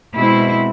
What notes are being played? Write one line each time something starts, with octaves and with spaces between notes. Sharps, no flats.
B2 G#3 C4 E4